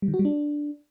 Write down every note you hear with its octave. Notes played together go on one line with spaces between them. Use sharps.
G3
D#3
F#4
G3
D4